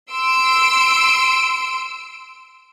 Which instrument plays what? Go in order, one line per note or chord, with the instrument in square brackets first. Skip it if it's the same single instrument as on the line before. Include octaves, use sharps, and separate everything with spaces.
[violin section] C6 E6 D7